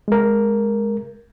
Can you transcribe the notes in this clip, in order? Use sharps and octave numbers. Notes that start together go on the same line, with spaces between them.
G#3 A#4